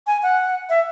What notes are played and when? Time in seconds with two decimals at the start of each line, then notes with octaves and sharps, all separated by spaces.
0.07 G#5
0.23 F#5
0.69 E5